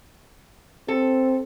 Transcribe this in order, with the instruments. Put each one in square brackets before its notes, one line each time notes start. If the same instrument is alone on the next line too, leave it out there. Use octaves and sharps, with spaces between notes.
[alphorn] C4 [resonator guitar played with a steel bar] A4